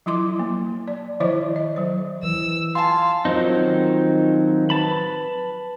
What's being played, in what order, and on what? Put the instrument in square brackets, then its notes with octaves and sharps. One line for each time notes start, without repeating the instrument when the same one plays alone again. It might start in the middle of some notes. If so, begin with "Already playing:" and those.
[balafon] F3 F#3 E4 C6 D6
A#3
D5
D#3 F3 E4 C5 D5 E5
D#5
F#3 C5
[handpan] E3 [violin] E6
[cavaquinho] F4 G#5 A5 [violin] F5 [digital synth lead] C6
[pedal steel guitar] D#3 F3 F#3 C4 D#4
B4 A5 B5